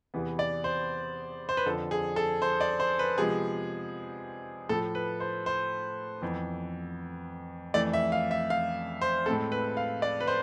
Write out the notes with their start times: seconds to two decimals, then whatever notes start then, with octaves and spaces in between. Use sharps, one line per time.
0.14 E2 C3 E3 B3
0.39 D5
0.64 C5
1.49 C5
1.57 B4
1.66 F2 D3 F3 A4
1.91 G#4
2.16 A4
2.42 C5
2.61 D5
2.80 C5
2.99 B4
3.18 C3 F3 G#3 B3 G#4
4.69 A2 F3 A3 A4
4.95 B4
5.20 C5
5.46 C5
6.22 F2 E3 B3
7.74 F2 E3 A3 D5
7.93 E5
8.12 F5
8.31 E5
8.50 F5
9.02 C5
9.26 A2 G#3 C4 A4
9.52 B4
9.77 F5
10.02 D5
10.21 B4
10.27 C5